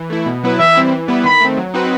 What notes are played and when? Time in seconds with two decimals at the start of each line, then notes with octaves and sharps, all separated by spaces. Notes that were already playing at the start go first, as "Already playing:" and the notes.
Already playing: E3
0.10 A3 E4
0.26 B2
0.44 F#3 B3 E4 B4
0.60 E3 E5
0.75 G3 C4 E4
0.91 E3
1.08 G3 B3 E4 B4
1.24 D#3 B5
1.41 A3 C4
1.57 F#3
1.74 C4 D#4 F#4 B4